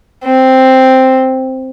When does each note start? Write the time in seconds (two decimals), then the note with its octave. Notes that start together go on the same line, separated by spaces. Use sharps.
0.24 C4